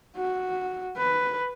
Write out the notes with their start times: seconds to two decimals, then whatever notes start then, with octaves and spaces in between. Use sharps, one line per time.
0.17 F#4
0.97 B4